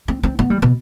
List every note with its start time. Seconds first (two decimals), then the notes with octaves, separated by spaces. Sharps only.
0.08 C4
0.23 C4
0.39 B3
0.50 G3
0.62 B2